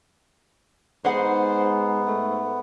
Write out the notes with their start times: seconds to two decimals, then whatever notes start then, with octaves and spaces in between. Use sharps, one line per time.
1.05 G#2 B3 D#4 G#4 C5 F#5
2.07 A3